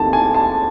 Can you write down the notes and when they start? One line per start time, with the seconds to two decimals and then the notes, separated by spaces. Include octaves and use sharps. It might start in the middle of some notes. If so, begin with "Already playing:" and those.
Already playing: D#2 D#3 A3 C4 A5
0.13 G#5
0.34 A5